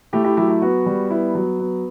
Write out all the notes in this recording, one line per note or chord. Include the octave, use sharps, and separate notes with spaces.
A3 E4 G4
E4 G4
F#3 E4 G4
E4
B3 F#4
G3
B3 E4
F#3
B3